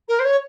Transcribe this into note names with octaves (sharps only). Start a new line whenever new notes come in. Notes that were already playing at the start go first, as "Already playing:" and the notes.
A#4
C5
C#5